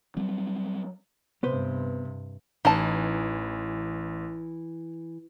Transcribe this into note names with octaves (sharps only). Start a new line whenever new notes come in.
F#3 G3 C4
G2 C3 B3 B4 C5
A1 E3 D#4 A5